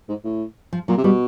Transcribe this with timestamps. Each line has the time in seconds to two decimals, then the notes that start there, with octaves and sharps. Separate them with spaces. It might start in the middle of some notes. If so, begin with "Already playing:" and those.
0.09 G#2
0.24 A2
0.73 F3
0.88 A#2 F#3
0.98 C3
1.04 B2 G3